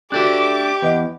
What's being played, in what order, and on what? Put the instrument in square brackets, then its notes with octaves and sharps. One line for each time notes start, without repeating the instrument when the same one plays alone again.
[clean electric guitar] D4 D5 E5 [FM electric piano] F#4 A4 F#6 [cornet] G4 [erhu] D6
[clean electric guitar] E2 [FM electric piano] B4 D#5 F#5